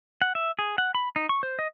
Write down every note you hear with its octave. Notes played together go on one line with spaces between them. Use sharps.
F#5
E5
G#4
F#5
B5
D#4
C#6
C5
D#5